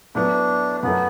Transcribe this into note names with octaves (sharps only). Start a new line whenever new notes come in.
A2 F#3 B3 D4
F#2 F#3 A3 B3